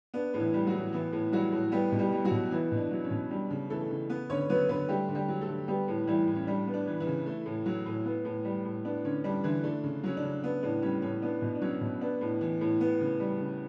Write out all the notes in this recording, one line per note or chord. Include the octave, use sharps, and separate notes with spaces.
B3 D4
A2
E3 E4
G3
F#3 F#4
A2
E3 B3 E4
A2
F#3 G3 F#4
A2
G3 B3 G4
B2
G3 G4
G3
F#3 F#4
B2
E3 B3 E4
B2
D4
F#3
C#4
B2
G3 D4
C#3
E3 A3 A4
C#3
B3 B4
D3 C#4 C#5
F#3 B3 B4
D3 B3 B4
G3 A3 G4
D3
G3 G4
F#3
A3 A4
D3
G3 B3 G4
A2
E3 G3 E4
A2
C#4
G3 D4
B3
D4
E3
E3 E4
C#3
A3
A2
F#3
A2
B3
A2
G3
A2
B3 D4
D3 C#4
G3 D4
D3 E3 E4
A3 D4
C#3
F#3 C#4
D4
C#3
B3 D4
A2 D4
G3 C#4
A2 C#4
B3 D4
B2
D4
F#3 C#4
B2
B3 D4
A2
E3
A2
B3
C#3
G3
C#3